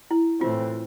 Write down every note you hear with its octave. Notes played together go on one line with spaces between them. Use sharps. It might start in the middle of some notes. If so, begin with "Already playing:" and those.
E4
A2 E3 A3 C4 F4